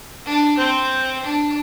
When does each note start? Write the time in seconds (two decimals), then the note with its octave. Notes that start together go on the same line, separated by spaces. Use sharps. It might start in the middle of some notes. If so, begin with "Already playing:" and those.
0.26 D4
0.58 C4 C5
1.23 D4